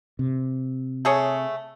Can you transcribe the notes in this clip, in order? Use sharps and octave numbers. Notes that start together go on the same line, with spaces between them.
C3
A3 G#4 C#5